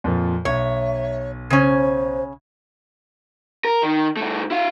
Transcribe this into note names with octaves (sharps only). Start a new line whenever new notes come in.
F2 A#2 F3
B1 C#5 E5
C#3 C#4 C5
A#4
D#3
G2 A3
E4 F5